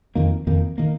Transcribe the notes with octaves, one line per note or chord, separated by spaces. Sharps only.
F2 D#3 A#3
F2 D#3 A#3
D#3 A#3